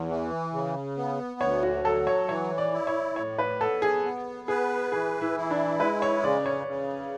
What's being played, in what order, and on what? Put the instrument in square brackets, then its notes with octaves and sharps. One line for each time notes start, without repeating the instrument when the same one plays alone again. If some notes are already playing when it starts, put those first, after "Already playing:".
Already playing: [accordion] E2
E3
C#3
B3
[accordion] D2 [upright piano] C#5
[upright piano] F#4
[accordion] F#3 [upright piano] A4
[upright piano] C#5
[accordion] E3 [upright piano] C#5
[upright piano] D5
[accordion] E4
[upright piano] C#5
[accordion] A2 [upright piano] C#5
[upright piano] B4
[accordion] B3 [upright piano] A4
[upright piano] G#4
[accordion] B3
[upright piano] G#4 [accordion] B4
[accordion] E3 [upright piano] G#4
[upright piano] E4
[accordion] E4
[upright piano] D4
[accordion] G#3 [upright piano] B4
[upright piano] C#5
[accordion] C#3 [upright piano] D5
[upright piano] C#5
[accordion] C#3